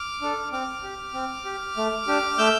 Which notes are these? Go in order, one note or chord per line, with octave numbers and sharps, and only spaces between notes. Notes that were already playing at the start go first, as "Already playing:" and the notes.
Already playing: D6 F6
D4 A4
C4 D6 F6
G4
C4
G4
A3
D4 G4
A3 E6 G6